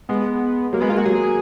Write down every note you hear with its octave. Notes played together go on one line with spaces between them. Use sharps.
G#3 B3
F#3 A#3
G#3 B3
A#3 F4
G#3 F#4
F#3 G#4